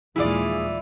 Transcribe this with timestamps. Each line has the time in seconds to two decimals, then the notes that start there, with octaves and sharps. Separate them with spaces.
0.16 A#1 D#2 E3 G#3 E4 F4 G#4 D5